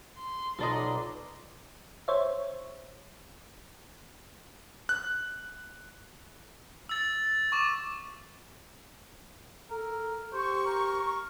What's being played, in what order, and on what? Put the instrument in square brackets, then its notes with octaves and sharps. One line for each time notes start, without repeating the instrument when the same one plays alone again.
[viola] C6
[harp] B1 [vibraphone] F4 A#5 D6 [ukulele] A4 D5 D#5
[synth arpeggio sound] C5 C#5 E5
[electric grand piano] F#6
[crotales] E6 A6
C#6 D6 E7
[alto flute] A4 [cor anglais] A#4
[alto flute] G4 [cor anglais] C5 [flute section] C#6
[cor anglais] A#4